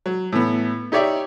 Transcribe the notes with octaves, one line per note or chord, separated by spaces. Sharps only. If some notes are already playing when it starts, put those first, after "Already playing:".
F#3
A2 E3 B3
D#4 G4 C#5 D5 E5